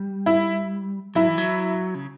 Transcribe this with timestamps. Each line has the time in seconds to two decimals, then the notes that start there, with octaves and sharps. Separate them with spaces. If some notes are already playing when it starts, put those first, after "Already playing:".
Already playing: G3
0.26 E4
1.15 F#3 E4
1.28 E3
1.38 F#3
1.95 C#3